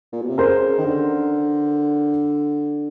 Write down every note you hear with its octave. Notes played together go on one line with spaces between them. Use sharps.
A#2
B2
C3
C#3 A#4 C5
D#3
D3